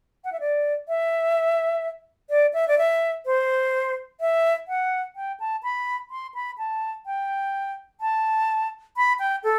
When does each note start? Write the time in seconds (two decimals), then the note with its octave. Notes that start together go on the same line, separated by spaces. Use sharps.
0.24 F#5
0.32 E5
0.40 D5
0.88 E5
2.30 D5
2.54 E5
2.68 D5
2.78 E5
3.26 C5
4.20 E5
4.68 F#5
5.16 G5
5.40 A5
5.63 B5
6.11 C6
6.35 B5
6.58 A5
7.06 G5
8.01 A5
8.97 B5
9.19 G5
9.44 A4